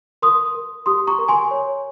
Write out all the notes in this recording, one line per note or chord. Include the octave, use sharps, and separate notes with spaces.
A#4 C6 D#6
A#4
G4 C6 D#6
A#5 C#6
A#4
G#5 C6
C#5